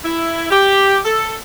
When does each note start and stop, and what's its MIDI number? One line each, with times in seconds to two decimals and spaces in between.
0.04 0.48 64
0.51 0.98 67
1.05 1.36 69